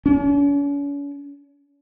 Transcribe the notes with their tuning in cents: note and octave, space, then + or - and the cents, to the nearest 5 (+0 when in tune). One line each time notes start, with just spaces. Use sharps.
C#4 +40